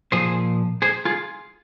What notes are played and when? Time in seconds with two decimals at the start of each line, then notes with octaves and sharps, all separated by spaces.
0.12 A#2 F3 G#4 C5
0.82 G#4 C5
1.05 F4 G#4